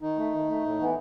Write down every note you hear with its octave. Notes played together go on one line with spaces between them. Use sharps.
D#3 D#4
A3
D#3
A3
A2
E3 B3